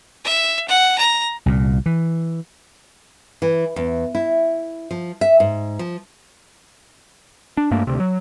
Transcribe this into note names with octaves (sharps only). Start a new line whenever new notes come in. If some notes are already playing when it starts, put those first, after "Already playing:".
E5
F#5
A#5
C2 A#2
E3
E3
E2
E4
F3
E5
G#2
F3
D4
G2 A3 A#3 D4
D2 C3
F#3